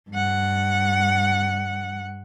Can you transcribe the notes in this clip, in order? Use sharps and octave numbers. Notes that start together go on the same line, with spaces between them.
G2 F#5